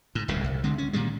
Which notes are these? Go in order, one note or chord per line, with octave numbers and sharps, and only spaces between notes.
G#2
D1 C2 A2 C#3
C2
D3 G#3 C4
C#4
A#2 D#3 G3 G#3